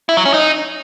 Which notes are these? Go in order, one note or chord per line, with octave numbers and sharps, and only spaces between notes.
E4
F#3
C#4
D#4